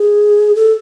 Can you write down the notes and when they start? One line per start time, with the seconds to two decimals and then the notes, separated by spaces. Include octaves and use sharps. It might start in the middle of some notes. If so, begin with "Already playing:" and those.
Already playing: G#4
0.55 A4